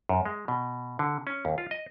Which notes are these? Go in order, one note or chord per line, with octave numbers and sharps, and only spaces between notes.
F#2
G#3
B2
D3
C#4
D#2
F4
D#5